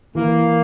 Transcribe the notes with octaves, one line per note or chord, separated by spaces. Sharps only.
E3 A#3